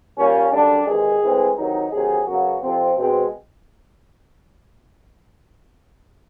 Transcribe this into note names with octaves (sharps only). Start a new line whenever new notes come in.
A#2 G3 A#3 C#4
F#2 D3 G3 D4
E2 C3 D#3 G#3 G#4
A2 E3 G#3 C4
E2 C3 D#3 F#3 D#4
D2 C3 D#3 F#3 G#4
F#2 C#3 F#3 B3 F#4
F2 C3 F3 C4
B2 G#3 C4